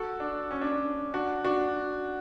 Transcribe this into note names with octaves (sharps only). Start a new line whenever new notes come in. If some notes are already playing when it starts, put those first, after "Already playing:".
Already playing: F#4 A4
D4
C#4
D4
D4
D4 F#4
D4 F#4